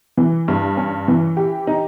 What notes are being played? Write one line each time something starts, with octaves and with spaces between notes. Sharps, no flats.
E3
G2
C#4
E3
G4
D#4